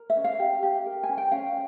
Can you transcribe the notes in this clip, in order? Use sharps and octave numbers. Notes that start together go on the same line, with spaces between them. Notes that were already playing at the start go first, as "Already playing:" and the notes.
Already playing: A#4
E5
C#4
F5
G4
G4
A#4
G#5
C#4
G5
C#4 F5